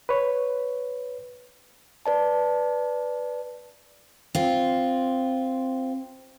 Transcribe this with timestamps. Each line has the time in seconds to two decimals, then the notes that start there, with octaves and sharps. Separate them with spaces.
0.09 B4 C#5
2.06 B4 D5 A5
4.35 C4 F4